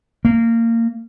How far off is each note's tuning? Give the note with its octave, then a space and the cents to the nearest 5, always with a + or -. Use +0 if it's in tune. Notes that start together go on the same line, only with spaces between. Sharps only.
A#3 -25